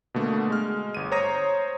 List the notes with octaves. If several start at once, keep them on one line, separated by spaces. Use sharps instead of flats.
B2 D3 A3 A#3
G#3 F6
G1 D#7
C5 C#5 A#5 D#6 A#6